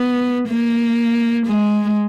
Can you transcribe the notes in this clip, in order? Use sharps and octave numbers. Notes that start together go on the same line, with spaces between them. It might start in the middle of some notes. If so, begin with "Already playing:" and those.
Already playing: B3
A#3
G#3